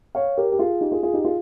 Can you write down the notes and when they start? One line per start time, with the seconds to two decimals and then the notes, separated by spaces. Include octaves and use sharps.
0.15 C#5 F5
0.37 G4 A#4
0.52 G4
0.59 F4 G#4
0.81 D#4 G4
0.91 F4 G#4
1.03 F4 G#4
1.13 D#4 G4
1.25 F4 G#4